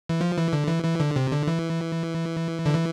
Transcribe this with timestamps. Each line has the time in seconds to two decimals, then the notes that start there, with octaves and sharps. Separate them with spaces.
0.09 E3
0.21 F3
0.37 E3
0.53 D3
0.68 E3
0.84 E3
1.00 D3
1.16 C3
1.32 D3
1.47 E3
2.66 D3
2.74 E3